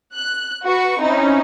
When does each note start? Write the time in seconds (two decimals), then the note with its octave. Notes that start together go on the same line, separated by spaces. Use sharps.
0.14 F#6
0.63 F#4 B4 C#6
1.01 C4 C#4 D#4 E4